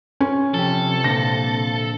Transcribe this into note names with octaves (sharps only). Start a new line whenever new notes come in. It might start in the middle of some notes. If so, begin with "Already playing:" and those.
C#4
C3 F3 G4 A4
A#2 D3 A#6